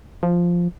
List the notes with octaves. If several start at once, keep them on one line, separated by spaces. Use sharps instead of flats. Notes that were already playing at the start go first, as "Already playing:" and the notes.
F3